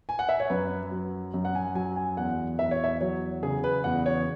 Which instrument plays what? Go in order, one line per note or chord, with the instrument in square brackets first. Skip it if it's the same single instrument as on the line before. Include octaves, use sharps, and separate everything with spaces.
[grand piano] G#5
F#5
E5
C#5
F#2 B4
F#3
F#2
F#5
G#5
F#3 G#5
G#5
E2 F#5
E2 E5
C#5
E5
F#3 C#5
C#3 G#4
B4
E2 F#5
C#5